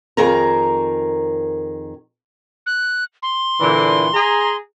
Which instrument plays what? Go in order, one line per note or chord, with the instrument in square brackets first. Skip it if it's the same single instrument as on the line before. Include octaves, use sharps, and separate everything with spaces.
[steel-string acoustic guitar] F2 D#3 G#4 A#4 A#5
[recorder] F#6
C6
[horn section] A#2 D3 E3
G#4 A#5